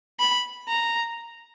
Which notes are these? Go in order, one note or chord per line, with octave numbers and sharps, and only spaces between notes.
B5
A#5